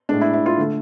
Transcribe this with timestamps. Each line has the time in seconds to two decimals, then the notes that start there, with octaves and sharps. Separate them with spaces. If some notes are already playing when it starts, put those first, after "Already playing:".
0.09 A2 G#3 D4
0.21 E4
0.33 E4
0.46 F4
0.58 D3 A3